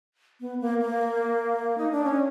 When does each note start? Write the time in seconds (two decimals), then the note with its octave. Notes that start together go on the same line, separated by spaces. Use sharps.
0.41 B3
0.61 A#3
0.81 A#3
1.78 D#4
1.92 D4
2.04 C#4